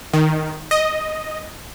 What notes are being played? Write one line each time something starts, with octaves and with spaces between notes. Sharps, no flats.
D#3
D#5